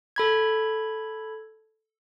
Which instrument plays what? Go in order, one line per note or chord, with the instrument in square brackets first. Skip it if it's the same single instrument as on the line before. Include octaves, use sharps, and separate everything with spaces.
[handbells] A4 B5 G#6